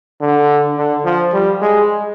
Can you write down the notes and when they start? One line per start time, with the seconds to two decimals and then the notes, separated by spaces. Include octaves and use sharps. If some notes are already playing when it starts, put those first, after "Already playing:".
0.21 D3
0.77 D3
1.05 F3
1.33 G3
1.62 G#3